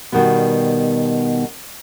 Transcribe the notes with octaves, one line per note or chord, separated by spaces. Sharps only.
B2 D#3 G3 B3